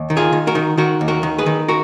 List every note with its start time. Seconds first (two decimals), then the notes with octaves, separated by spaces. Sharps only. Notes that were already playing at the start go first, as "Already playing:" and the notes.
Already playing: D#2
0.10 D#3
0.17 F4 G#4
0.33 D#3
0.47 F#4 A#4
0.55 D#3
0.78 D#3 F#4 A#4
1.01 D#2
1.08 F#4 A#4
1.23 D#3
1.38 G#4 B4
1.46 D#3
1.68 F#4 A#4